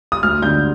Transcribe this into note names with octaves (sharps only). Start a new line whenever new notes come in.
D#6
D2 F6
D3 G6